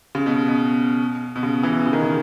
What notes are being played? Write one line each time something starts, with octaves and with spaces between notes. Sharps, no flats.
C#3
B2
B2
B2
C#3
E3
C#3
D#3
C#3